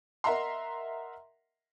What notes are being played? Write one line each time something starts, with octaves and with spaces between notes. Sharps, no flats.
A#4 D#5 E5 F#5 A#5 C6